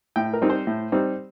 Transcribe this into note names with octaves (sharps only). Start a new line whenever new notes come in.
A2 G5
A#4
G3 C4 D#4
C5
A2
G3 C4 D#4